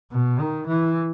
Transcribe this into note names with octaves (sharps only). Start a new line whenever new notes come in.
B2
D#3
E3